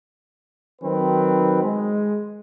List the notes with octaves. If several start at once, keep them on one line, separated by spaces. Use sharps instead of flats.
D#3 F#3 C4 B4
G#3